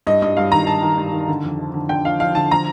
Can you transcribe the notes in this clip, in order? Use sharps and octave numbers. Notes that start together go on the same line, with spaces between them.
G2 D#5
G2 D#5
G2 F5
D#3 A#5
G2 A5
D#3
G2
D#3
D3
F2
F3
D3
D3 G5
F3 F5
F3 F5
D3 A5
F3 A#5